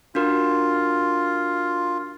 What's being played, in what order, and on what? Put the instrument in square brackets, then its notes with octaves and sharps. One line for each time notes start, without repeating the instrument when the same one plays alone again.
[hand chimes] D4 F#4 A#4 [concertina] F4